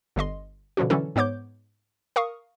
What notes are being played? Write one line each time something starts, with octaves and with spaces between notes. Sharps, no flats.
G1 D3 D#5 C6
B2 D3 F3 C#4 F#4
D3 E3 F#3 C#4 A4
G#2 B3 C#5 D6 G6
A#4 F5 C#6 D#6